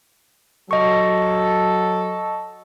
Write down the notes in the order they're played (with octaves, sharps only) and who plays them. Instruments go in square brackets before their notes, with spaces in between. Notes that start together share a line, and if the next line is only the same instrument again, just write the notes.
[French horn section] F#3 [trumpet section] A4 [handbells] D#5 C#6